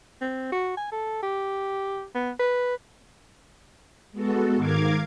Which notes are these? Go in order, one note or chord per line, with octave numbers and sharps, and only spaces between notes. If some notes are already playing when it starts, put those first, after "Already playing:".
C4
F#4
G#5
A4
G4
B3
B4
G#3 B3 F#4 A4
G#2 D#3 A#4 F5 D6 G#6